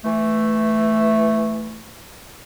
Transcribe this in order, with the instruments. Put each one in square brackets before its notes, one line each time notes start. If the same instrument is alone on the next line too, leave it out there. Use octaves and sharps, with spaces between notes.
[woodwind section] E3 A3